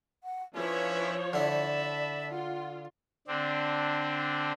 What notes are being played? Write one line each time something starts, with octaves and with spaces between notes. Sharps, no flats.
F#5
F3 C#4 D4 E4 B4 C#5
D3 E4 D5 E5 A5 B5
F4 F#5
D3 C4 D4